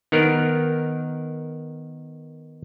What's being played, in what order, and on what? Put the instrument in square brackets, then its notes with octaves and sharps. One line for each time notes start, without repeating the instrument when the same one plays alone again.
[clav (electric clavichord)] D#3 B3 A#4